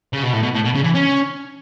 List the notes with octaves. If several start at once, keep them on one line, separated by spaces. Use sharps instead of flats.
C#3
B2
A2
B2
A2
B2
C#3
E3
C#4